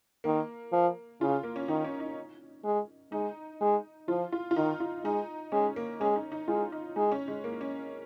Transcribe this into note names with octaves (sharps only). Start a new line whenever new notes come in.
D#3 A#3
F3
C#3 F4
A#3
C#4
D#3 D#4
C#4
D#4
G#3
G#3 D#4
G#3
F3 F4
F4
F4
D#3 D#4
F4
G#3 D#4
G#3 C#4
A#3
G#3 C#4
D#4
D#4
G#3 F4
D#4
G#3 D#4
C#4
G#3
A#3
C#4